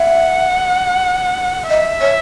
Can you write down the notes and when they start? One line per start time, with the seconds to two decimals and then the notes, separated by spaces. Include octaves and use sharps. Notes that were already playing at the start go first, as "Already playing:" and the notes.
Already playing: E5 F#5
1.70 D#5 E5
2.01 C#5